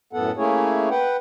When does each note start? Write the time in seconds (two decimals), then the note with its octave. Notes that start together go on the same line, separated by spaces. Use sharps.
0.13 F#2 A2 B3 A4 F#5
0.37 A3 A#3 C#4 E4 G#4 C#5
0.90 B4 F#5 G5